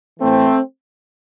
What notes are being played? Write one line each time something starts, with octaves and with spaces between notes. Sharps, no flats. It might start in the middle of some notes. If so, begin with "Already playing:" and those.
A2 E3 A3 C4